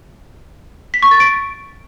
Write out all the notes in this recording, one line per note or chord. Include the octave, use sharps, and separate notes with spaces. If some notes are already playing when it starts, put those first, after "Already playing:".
B6
C#6
A6
D7